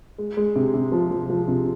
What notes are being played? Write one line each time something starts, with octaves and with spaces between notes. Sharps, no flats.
G#3
G#3
C3
C3
F3
F3
F3
C3